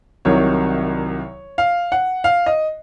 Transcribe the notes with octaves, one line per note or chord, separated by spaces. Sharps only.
C2 C3 D#3 F#3 C#5
F5
F#5
F5
D#5